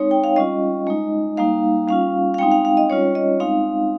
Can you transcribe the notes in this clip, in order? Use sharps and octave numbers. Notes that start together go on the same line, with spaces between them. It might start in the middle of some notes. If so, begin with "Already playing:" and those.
Already playing: G#3 C4 D#4 C#5
G5
F5
G3 C#4 F4 D#5
G#3 D#4
G3 A#3 D#4 F5
G3 C#4 F4 F5
F5
G#3 C4 D#4 G5
F5
F5
D#5
G3 C#4 F4 C#5
D#5
G#3 C4 D#4 F5